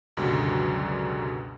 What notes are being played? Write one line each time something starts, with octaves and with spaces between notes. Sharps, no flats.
C#2 F#2 B2 D3 F#3 G3